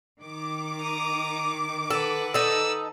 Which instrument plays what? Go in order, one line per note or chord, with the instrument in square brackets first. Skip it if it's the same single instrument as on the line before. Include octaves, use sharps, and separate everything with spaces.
[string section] D#3 D6
[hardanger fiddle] A#5 D#6
[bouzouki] A4 [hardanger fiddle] B4 F#5
[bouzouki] D#4 A4 [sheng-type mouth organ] E6